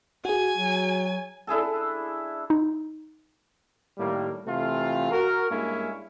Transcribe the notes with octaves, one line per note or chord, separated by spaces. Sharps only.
F#4 G#4 G#5
F#3
D4 E4 G#4 A4
D#4
A2 D#3 G3 A#3
C3 E3 A3 F4
F#4 A#4
G2 G#3 A#3 C#4 E4